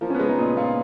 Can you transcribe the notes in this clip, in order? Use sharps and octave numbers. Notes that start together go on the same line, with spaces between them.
F3 A#3
C#4
B3
G#3
D#4
A#2
A#2 F4